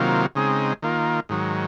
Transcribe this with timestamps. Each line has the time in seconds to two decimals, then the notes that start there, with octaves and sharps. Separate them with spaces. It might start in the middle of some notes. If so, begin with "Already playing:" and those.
Already playing: C3 D#3 F#3 A#3 F4
0.35 C#3 G#3 C4 D#4
0.82 D#3 A#3 F4
1.29 G#2 D#3 F#3